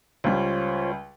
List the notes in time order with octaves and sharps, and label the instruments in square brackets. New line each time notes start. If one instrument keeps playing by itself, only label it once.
[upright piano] C#2 G3 [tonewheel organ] F4 C5 C#5